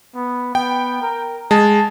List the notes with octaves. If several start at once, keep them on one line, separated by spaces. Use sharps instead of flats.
B3
B3 G5
A#4
G#3 A5